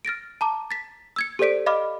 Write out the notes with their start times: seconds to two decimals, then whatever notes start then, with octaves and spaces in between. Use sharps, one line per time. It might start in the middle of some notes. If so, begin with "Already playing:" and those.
0.05 F6 A6 A#6 D7
0.41 A5 A#5 D6
0.71 A6 B6
1.16 E6 G#6 C#7
1.39 G4 A4 C5 D5 B6 D7
1.66 D#5 F5 B5 D6 F6